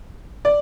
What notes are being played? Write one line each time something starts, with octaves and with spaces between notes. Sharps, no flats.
D5